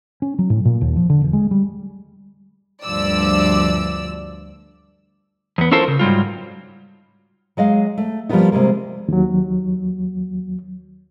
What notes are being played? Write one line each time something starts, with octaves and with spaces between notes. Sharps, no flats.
C#4
F#3
A2
A#2
D#2
F3
D3
E1
G#3
G3
D2 G2 F3 D5 E6
E2 B3
C#4 E4 F4 A4 A#4 C5
C#3
G#2 F#3 G3 F4
F#3 G#3 D#5 F5
A3
F3 G3 G#3 A#3 B3 D#4
C3 G3 G#3 A#3
D#2 F#3